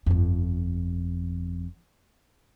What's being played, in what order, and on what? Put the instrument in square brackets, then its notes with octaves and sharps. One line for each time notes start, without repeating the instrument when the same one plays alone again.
[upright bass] G1 F2